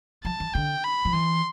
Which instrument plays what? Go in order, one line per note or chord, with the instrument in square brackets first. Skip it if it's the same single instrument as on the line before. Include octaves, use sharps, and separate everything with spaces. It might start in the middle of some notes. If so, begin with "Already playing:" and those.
[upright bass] F3 [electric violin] A5
[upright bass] E3
[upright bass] D3 [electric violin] G5
[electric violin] B5
[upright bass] F3
[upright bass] E3 [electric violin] C6